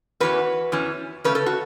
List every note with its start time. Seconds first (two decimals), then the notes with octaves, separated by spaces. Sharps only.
0.20 E2 E3 C#4 F#4 B4
0.72 E2 E3 C#4
1.24 C#3 A3 C#4 B4
1.35 A4
1.46 F#4